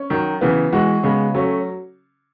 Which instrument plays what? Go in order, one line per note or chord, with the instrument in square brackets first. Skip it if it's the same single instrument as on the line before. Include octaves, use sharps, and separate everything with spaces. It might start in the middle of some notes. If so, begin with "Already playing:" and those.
Already playing: [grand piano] C#4
[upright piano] D#3 [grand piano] F#3
[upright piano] C#3 E3 [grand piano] B3
[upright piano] E3 G#3 [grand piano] F#4
[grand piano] C#3 [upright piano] G#3 B3
[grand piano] F#3 [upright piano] A3 C#4